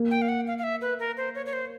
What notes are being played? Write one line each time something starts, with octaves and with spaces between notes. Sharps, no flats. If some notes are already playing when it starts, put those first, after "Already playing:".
Already playing: A#3
G5
F5
F#5
F5
F5
E5
B4
A#4
C5
C#5
C#5
C5